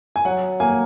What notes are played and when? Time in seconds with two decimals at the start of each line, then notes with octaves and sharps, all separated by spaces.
0.16 G#5
0.25 F#3 F#5
0.60 A#3 G#5